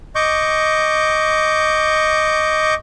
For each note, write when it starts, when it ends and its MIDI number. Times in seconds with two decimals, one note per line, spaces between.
0.15 2.74 75
0.15 2.74 85
0.15 2.74 86
0.15 2.74 91